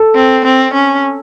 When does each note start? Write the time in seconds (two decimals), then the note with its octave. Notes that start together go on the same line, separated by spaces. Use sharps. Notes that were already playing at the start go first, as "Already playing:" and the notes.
Already playing: A4
0.15 C4
0.45 C4
0.73 C#4